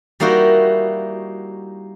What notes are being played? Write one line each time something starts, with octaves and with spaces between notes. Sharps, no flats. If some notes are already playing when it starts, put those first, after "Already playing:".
G3 A#3 D#4 E4 F#4